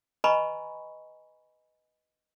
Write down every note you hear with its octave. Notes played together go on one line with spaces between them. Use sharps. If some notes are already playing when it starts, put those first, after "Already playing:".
B4 D#5 G#5 A#5 B5 C#6